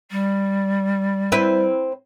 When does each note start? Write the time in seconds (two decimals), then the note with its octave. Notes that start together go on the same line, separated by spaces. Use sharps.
0.11 G3
1.32 C4 E4 B4